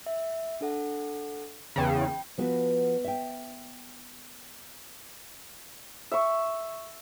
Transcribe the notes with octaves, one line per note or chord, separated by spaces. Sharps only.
E5
D4 A4 F#5
E2 C#3 G5 B5
F3 B3 F#4 B4
E5 G5
E5 C#6